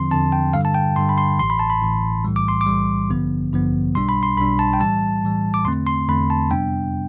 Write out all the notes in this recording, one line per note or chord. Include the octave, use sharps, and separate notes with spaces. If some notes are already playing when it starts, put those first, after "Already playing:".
Already playing: E2 D3 F3 C4 C6
E2 D3 F3 C4 A5
G5
G2 D3 G3 F5
A5
G5
G2 D3 G3 C6
B5
C6
A1 A2 E3 C6
B5
A5
B5
A1 A2 E3
B1 A2 E3 G3
D6
C6
D6
B1 A2 E3 G3
A1 G2 D3 F3 B3
A1 G2 D3 F3 B3
B1 B2 G3 D4 C6
B5
C6
B1 B2 G3 D4 B5
A5
G5
A2 E3 G3 A5
A2 E3 G3
D6
E2 D3 A3 C4 C6
C6
E2 D3 A3 C4 B5
A5
F2 C3 G3 B3 D4 G5